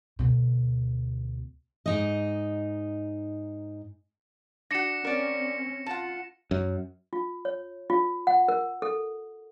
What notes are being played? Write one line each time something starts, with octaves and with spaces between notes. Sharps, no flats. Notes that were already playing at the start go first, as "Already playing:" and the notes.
D2 B2
G#2 D#4 D#5
D4 F#4 A#6 C#7 E7
C4 C#4 A#4 D5
F4 F#5 A5
F#2
F4
C#5
F4
F#5
A#4
A4